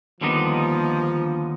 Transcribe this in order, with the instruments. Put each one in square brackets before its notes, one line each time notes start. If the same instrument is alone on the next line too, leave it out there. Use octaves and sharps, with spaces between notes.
[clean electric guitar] D#2 D3 G3 B3 D#4 [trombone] F3